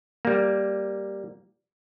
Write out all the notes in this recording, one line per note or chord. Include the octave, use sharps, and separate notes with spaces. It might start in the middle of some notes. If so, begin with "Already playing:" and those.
G3 A#3